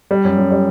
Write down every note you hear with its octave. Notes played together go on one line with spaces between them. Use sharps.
G3
F#2
F#2
G3